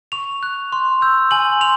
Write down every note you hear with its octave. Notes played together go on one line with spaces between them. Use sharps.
C#6 F7
F#6
C6
E6 G6
G#5 F#7
C6 F7